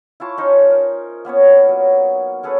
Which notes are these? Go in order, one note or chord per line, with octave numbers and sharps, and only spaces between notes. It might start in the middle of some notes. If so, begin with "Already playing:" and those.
E4 F4 A5 C#6
C#4 D#4 C5
A#4
A#3 B3 C#4 C#5
F#3
C#4 G#4 A4 B4